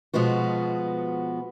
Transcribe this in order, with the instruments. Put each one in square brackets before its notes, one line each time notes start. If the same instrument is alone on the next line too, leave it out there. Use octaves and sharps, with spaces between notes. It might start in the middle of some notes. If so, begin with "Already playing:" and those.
[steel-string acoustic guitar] B2 F3 G#3 B3 F#4